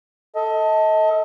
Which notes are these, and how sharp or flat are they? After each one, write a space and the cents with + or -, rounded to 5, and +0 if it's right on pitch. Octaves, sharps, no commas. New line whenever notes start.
A4 +5 D#5 +35